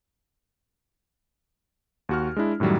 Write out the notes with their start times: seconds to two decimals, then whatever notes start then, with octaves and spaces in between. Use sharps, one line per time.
2.09 D#2 F#4 F6
2.37 G#3 D4 E4
2.60 F#2 A2 D#3 F#3 G3